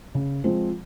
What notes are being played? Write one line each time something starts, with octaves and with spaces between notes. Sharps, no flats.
C#3
F3 G#3 C4